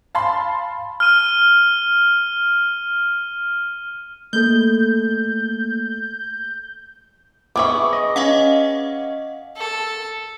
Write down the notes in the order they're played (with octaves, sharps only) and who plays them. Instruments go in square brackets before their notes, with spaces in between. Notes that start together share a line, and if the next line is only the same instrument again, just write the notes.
[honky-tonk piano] F5 A5 B5 C6
[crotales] F6 D#7
[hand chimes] A3 A#3 A4 [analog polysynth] G6
[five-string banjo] B3 G#4 E5 [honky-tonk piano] C#6 D6
[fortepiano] D#5
[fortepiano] C#4 [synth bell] D#5 F5 F#5
[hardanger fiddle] A4